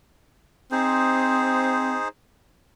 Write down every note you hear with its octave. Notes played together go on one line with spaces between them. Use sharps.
C4 D#4 G#4 C5